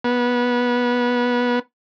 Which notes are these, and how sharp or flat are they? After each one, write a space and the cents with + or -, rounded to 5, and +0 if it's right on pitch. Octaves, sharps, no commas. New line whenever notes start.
B3 -20